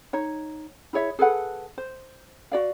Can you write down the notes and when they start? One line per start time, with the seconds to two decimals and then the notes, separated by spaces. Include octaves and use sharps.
0.13 D#4 C#5
0.93 E4 G#4 C#5 E5
1.19 G#4 A4 B4 F#5
1.78 C5
2.52 F#4 D5 F5